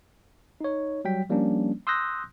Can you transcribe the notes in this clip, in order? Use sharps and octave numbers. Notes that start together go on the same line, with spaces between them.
D#4 C#5
F#3 G3 G5 B6
F3 G3 A#3 C#4 D4
C6 D#6 E6 F#6 G6 A#6